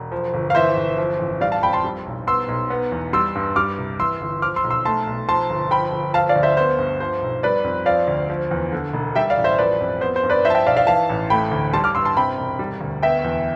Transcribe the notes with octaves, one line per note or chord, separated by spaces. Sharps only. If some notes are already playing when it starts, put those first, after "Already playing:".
Already playing: E1
F3
G1
F5
E3 C5 E5
G1
F3
A1
G3 D5 F5
F5 A5
F2 G5 B5
A5 C6
G3
B1
B3 C6 E6
B1
B3
E2
G3 C6 E6
G2
G3 D6 F6
C2
E3 C6 E6
G1
F3 D6 F6
C6 E6
B1
C6 E6
A3 A5 C6
B1
F3 A5 C6
G1
F3 G5 B5
G1
F3 F5 A5
D5 F5
D2
C5 E5
B3 C5
G2
F3 C5
B1
G3 B4 D5
F2
F3 D5 F5
D2
F3
E2
D3
E1
G3 E5 G5
D5 F5
A1
C5 E5
F3 B4 D5
F2
B3 C5
C5
G2
B4 D5
F3 C5 E5
A5
E5 G5
B1 D5 F5
D5 F5
E3 F5 A5
A1
A3 G5 B5
D2
G3 A5 C6
D6 F6
G2 C6 E6
A5 C6
C3 G5 B5
E1
G3
D2
B3 E5 G5
E2